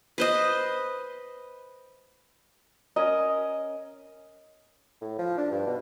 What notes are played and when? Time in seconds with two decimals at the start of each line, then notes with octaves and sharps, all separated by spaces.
0.18 B4 C5 D#5
2.96 C#4 A#4 D#5
5.01 A2
5.19 F3
5.37 D4
5.51 G2
5.67 B2